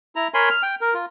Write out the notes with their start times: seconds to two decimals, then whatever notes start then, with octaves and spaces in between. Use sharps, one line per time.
0.16 E4 A#5
0.34 A#4 C#5 G#5 B5 C6
0.50 F6
0.63 G5
0.81 A#4
0.94 F4